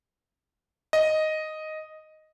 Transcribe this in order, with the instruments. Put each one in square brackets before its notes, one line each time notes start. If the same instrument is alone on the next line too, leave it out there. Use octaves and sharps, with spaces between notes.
[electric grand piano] D#5